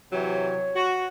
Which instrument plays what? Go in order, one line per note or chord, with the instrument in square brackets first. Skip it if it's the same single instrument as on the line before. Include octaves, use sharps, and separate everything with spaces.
[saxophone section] C3 E3 F#3 [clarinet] C#5
[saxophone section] F#4